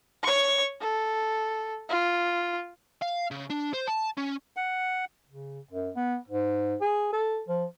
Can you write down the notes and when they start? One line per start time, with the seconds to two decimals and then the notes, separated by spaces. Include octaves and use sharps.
0.23 C#5 C#6
0.81 A4
1.89 F4
3.02 F5
3.31 C#3
3.50 D4
3.74 C5
3.88 A5
4.17 C#4
4.56 F#5
5.29 C#3
5.71 F#2
5.96 B3
6.28 G#2
6.81 G#4
7.13 A4
7.48 F3